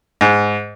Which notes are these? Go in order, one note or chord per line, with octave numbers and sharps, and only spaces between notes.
G#2